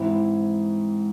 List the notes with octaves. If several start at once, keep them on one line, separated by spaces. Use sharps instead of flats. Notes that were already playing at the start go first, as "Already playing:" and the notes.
Already playing: G#2 E3 C4 E4